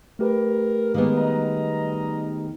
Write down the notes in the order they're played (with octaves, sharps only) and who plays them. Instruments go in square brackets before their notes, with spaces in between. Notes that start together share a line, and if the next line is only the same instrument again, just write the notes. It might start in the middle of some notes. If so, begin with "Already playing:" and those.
[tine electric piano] A3 G4 B4 [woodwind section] A#4
[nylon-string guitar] D#3 G#3 B3 [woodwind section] E3 A#3
[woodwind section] G3 D#5 A#5